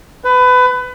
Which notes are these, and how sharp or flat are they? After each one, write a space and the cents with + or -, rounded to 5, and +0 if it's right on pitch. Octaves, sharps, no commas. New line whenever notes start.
B4 +25